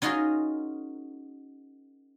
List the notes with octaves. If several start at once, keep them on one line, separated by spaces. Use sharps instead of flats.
C#4 D#4 F4 F#4 G#4 A#4